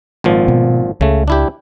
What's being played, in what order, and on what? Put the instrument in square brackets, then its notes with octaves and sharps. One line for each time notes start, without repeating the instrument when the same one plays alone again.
[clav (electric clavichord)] G#1 A#2 F3
[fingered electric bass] B2
[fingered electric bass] C#2 [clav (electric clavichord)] C#3 A3
[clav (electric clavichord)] D4 E4 G4